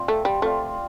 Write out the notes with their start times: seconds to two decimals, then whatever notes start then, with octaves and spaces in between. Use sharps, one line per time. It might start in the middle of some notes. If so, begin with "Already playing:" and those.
Already playing: C4 F4 D5 F5
0.08 A3
0.25 G3
0.42 A3 C4 F4 D5 F5